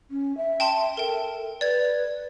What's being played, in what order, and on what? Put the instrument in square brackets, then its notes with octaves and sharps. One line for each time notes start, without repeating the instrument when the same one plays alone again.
[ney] C#4
E5
[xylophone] G5 A5 C6
[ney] A4 [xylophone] A#4 G5
[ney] B4 [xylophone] D5 G#6